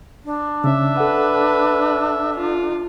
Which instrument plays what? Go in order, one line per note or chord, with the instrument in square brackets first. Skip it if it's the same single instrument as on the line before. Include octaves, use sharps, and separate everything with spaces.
[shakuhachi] D4
[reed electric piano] C#3 C#4 [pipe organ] E5
[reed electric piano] A4 F#5 [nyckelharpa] B4
[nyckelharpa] F4